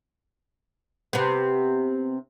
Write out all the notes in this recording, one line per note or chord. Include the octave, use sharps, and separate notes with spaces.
C3 B3